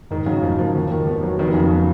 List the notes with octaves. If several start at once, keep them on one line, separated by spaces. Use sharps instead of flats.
G#2 D#3
C#3 F#3
G#2 F3
F3 A#3
D#2
D#3
B3
F#3
F1 D#3
F2 C#3
B3